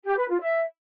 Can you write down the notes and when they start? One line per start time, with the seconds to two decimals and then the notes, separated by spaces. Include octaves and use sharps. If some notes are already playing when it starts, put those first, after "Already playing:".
0.05 G4
0.17 B4
0.29 F4
0.41 E5